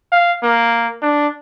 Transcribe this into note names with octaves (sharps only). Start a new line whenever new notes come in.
F5
A#3
D4